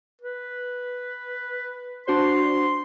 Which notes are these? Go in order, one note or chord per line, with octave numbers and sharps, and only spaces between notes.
B4
D4 F#4 C5 C6